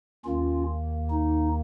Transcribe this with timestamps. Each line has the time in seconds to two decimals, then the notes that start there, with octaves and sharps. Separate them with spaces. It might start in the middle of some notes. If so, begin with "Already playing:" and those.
0.24 D#2 D#3 A#3 C#4 F4
1.10 D#4